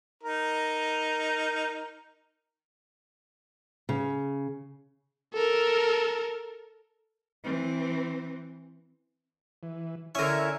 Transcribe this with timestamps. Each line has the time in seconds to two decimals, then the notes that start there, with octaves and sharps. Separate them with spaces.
0.23 D#4 A#4
3.89 C#3
5.34 A4 A#4
7.44 E3 C4
9.63 E3
10.15 D3 C#4 E4 A#4 C#5 E5 G#5